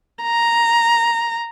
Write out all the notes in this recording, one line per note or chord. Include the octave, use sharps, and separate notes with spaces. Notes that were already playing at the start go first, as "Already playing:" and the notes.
A#5